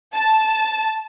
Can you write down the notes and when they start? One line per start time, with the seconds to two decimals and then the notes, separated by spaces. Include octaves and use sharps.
0.14 A5